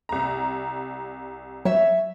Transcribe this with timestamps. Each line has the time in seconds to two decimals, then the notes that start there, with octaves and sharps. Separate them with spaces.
0.09 C2 A#5
1.65 F#3 C#5 E5